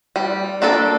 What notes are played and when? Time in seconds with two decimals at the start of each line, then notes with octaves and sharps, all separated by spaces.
0.16 G3
0.62 A#3 D4 A4 D5